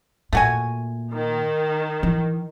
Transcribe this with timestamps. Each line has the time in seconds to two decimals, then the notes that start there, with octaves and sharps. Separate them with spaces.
0.33 A#2 A3 F#4 G#5
1.11 D#3
2.03 E3